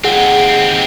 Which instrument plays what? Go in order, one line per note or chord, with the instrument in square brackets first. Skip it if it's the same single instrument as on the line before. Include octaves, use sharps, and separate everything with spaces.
[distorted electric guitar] D#2 C4 [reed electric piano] G#4 F#5